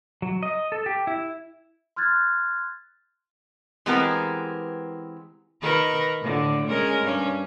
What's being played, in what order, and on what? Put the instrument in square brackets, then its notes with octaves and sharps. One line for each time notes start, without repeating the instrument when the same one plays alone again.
[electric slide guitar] F#3
D#5
A4
G4
E4
[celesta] C6 F6 F#6 G#6 A6
[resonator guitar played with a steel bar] E3 G#3 B3 C4 G4 A#4
[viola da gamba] D#3 A#4 B4
A2 D3
G#3 C#4 A#4
G2 C#4